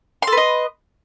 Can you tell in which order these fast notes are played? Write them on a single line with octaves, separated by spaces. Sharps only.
C6 A4 B4 D#5